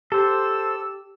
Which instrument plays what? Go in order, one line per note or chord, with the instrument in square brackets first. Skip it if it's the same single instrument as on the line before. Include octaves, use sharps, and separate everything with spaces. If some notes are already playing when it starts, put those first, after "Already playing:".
[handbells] G4 [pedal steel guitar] A4 C5 [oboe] E6